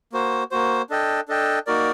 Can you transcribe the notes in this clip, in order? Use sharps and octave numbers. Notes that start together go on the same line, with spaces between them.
A#3 F#4 C5
A#3 F#4 C5
D4 A4 D#5 G5
D4 A4 D#5 G5
A#3 D#4 F#4 A#4 D5